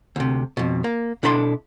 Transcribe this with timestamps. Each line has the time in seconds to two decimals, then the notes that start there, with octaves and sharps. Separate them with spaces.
0.16 D2 C3
0.57 F2 B2
0.84 A#3
1.23 B2 D4 E4 A4 B5 C6